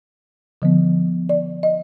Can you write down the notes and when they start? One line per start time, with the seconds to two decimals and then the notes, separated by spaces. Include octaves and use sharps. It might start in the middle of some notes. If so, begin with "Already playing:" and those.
0.62 D3 F3 B3
1.29 D5
1.63 D#5